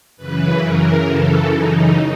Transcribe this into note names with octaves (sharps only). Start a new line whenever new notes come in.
F#2 C#3 E3 B4
A#4
A4
D#4